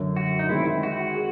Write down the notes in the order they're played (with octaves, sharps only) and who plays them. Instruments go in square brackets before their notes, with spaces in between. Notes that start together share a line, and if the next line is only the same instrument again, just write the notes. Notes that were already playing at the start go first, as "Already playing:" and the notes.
Already playing: [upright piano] F#2 D3 F#3
[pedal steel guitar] F#4
D#4
[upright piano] D#3 G#3 C4 [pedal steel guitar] E4
[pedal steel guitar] F#4
[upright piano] G#4